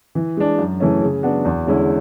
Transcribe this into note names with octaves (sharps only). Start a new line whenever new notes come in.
E3
G#3 D4
F#2
C#3 E3 A3 C#4
C#3
F#3 B3 D4 F#4
E2
D3 G#3 C#4 E4